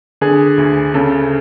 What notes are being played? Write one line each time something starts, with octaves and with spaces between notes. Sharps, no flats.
D3 G#4
D2
C#3 A4